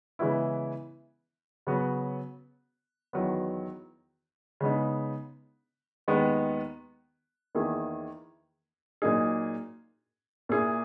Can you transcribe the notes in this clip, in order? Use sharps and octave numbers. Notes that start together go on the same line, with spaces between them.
C#3 E3 G#3 B3 E4
C#3 F#3 B3 F#4
E2 D#3 F#3 B3
C#3 G#3 B3 D#4
D#2 D#3 G#3 B3
E2 D#3 A#3 E4 G#4
A#2 F#3 A#3 D#4 G#4
A#2 A#3 E4 G#4